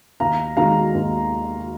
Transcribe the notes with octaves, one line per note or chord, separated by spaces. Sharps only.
D#2 F5 A#5
D#3 G#3 F5 A#5
D#2